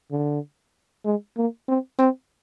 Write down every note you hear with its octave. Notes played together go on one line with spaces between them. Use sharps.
D3
G#3
A#3
C4
C4